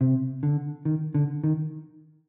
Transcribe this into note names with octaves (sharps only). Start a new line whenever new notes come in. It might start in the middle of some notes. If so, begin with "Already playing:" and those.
C3
D3
D#3
D3
D#3